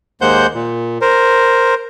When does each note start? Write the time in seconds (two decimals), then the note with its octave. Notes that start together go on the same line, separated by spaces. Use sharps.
0.21 D#2 G#3 A#3 C5 F#5 G6
0.54 A#2
1.01 A#4 C5